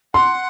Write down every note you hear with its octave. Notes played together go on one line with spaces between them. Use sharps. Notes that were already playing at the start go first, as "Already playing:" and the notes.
F#5 C6